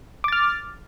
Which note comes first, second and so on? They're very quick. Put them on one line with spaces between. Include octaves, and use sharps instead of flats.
D6 A6 F6